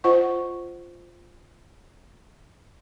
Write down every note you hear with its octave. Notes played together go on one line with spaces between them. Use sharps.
F4 C5 D#5 F#5 C#6